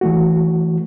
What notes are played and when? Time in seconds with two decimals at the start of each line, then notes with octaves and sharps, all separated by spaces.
0.01 E3 A3 F#4